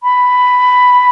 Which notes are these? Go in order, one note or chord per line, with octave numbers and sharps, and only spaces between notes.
B5